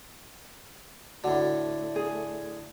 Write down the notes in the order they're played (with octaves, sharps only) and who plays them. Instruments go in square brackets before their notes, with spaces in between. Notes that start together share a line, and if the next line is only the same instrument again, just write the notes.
[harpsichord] A2 D3 [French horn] A3 [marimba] F#4 F#5
[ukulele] G#4